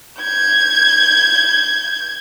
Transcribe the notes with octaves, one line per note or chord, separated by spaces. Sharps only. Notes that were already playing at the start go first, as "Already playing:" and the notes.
G6 G#6